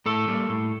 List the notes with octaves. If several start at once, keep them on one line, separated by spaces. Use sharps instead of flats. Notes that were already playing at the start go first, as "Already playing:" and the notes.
A2 A4
G3 A#3
A2